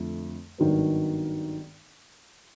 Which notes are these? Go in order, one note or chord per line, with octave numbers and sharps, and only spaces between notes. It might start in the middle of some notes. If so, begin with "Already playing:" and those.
Already playing: F2 D3 F3 A3
G#1 G2 D#3 F#3 B3